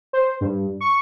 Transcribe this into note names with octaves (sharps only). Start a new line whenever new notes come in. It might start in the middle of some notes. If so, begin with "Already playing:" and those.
C5
G2
C#6